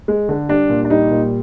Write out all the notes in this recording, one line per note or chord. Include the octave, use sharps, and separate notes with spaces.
G#3
D3
G3 D4
A#2
D4
G3 D#4
A#2